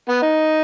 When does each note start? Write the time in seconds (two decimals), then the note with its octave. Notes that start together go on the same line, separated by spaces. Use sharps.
0.09 B3
0.22 D#4